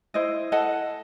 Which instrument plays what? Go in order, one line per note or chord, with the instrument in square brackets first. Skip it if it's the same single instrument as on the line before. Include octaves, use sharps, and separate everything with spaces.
[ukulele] E4 C5 D#5
A4 D#5 F#5